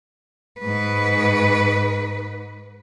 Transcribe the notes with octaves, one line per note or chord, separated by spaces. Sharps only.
G#2 B4